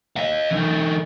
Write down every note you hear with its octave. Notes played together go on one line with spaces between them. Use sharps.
D#5 F5
E3 D#4